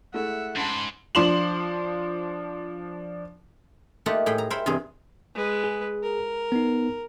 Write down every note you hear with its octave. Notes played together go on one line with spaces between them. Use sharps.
G#3 A3 E4 E5 F#5
G#2 C#3 A5 B5 C6
F3 D4 C6 E7 F#7
A3 A#3 D#4 F4 G4 F#5
A2 G#4 G5 B5
A#5
A#4 C5 C#5 E5 G5 B5
E2 G2 C3 C4 G#4
G#3 B4
G#4
A#4
B3 D#4